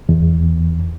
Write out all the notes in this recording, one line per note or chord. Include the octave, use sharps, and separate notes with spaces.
E2